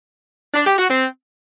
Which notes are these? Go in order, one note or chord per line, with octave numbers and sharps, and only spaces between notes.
D4
G4
F#4
C4